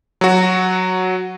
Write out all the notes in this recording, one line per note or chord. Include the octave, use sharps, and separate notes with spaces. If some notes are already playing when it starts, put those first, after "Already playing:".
F#3 F#4